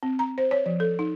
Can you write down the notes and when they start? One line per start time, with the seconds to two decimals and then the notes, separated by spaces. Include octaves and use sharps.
0.03 C4
0.19 A#5
0.38 C5
0.51 C#5
0.66 F3
0.80 A4
0.99 D#4